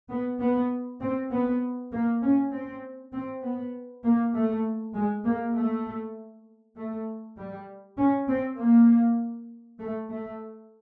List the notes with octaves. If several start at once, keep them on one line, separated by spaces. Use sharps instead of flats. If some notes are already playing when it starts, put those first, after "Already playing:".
B3
B3
C4
B3
A#3
C#4
C4
C4
B3
A#3
A3
G#3
A#3
A3
A3
G3
C#4
C4
A#3
A3
A3